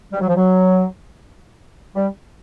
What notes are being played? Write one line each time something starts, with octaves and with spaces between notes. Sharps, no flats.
G3
F#3
F3
F#3
G3